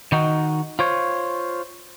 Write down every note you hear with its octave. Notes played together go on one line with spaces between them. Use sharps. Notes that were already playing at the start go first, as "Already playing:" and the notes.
D#3 D#4 F#4
F4 C5 C#5